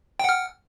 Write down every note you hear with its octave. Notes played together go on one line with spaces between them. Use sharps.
F#5 G5 F6